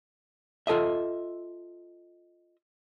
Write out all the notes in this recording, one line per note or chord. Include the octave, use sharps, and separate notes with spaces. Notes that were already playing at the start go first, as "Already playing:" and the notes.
F4 A4 D#5 E5